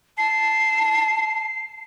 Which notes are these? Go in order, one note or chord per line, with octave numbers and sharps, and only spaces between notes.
A5 C7